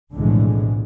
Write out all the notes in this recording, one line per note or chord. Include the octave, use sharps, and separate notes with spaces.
B1 F2 A2 D3 E3 G#3